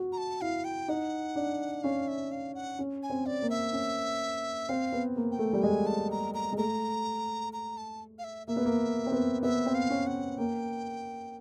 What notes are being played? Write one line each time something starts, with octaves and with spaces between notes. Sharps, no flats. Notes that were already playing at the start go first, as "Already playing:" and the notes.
Already playing: F#4
A#5
A5
E4 F5
G5
D#4 F#5
D4
C#4 F5
E5
F5
F#5
C#4
G#5
C4
D5
A#3
E5
C#4
C4 F5
B3
A#3
G5
A3
G3
G#3 G#5
A5
A#5
A#5
G#3
A3 A#5
A#5
A5
F5
E5
A#3 E5
B3
A#3
C4
B3
B3 E5
C4
F5
C#4
F#5
A#3 G5